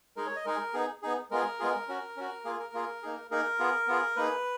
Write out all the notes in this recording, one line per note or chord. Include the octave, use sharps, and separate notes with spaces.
G#3 D#4 G#4 A#4
C#5
D#5
G#3 D#4 G#4 A#4
B3 D#4 G#4
B3 D#4 G#4
G#3 B3 F4 G#4 A#4
G#3 B3 F4 G#4
C#4 F#4
C#4 F#4
A#3 F4 G#4
A#4
A#3 F4 G#4
A#3 D#4 G#4
A#3 D#4 G#4 A#4
B3 F4 G#4
B3 F4 G#4
A#3 D#4 G#4 B4